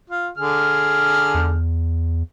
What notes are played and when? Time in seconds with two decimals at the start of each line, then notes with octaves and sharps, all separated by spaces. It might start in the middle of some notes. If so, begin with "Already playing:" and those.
0.10 F4
0.37 D3 G#4 F6
1.34 E2